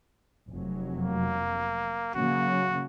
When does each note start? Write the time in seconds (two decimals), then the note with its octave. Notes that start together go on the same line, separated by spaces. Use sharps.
0.50 F1 F#3
0.97 A#3
2.14 C#3 F#3 A#3 F#4